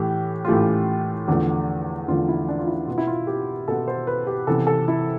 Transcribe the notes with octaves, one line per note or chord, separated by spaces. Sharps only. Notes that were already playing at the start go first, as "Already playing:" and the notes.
Already playing: A2 E3 A3 G4
F4
A2 E3 A3 G4
E2 D3 F3 A3
E2 D3 F3 A3 F4
E4
D4
F4
E4
B2 B3 F4
E4
F4
G4
B2 B3 A4
C5
B4
G4
C3 E3 B3 A4
A4
E4